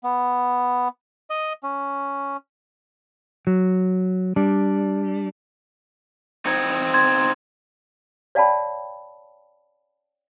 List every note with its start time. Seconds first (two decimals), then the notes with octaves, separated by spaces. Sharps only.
0.04 B3
1.30 D#5
1.63 C#4
3.47 F#3
4.36 G3 D4
6.46 C4 D#4 G#6 C#7
6.94 C6 G#6 A6
8.35 C#5 D5 F5 G5 A5 B5